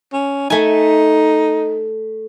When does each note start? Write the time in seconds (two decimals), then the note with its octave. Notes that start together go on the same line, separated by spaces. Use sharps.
0.13 C#4
0.50 A3 D#4 G#5